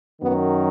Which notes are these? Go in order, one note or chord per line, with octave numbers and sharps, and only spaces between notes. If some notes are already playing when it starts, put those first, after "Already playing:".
F#2 D#3 F#3 B3